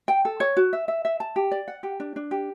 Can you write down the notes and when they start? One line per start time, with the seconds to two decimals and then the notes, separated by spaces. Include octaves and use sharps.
0.08 G5
0.25 A4
0.40 C#5
0.57 F#4
0.73 E5
0.88 E5
1.05 E5
1.20 A5
1.36 G4
1.51 D5
1.68 F#5
1.83 G4
2.00 D4
2.16 D4
2.31 G4